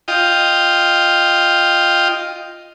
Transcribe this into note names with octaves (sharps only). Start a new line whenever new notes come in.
F4 D#5 G5